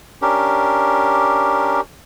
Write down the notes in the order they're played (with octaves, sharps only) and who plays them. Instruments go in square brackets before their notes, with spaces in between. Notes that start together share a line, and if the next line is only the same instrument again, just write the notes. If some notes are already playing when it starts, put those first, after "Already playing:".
[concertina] C#4 D4 G4 A#4